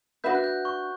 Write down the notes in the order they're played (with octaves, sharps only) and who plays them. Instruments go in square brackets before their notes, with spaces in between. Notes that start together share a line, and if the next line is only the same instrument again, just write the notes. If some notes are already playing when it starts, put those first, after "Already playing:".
[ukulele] D4 F#4 B4 E5 [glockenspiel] G6
[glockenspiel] F#6
G6
C#6